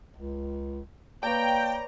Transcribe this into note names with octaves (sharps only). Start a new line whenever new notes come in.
C#2
A#3 B4 C#5 D5 G5 A#5